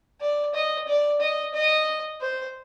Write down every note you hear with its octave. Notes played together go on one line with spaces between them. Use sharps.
D5
D#5
D5
D#5
D#5
C5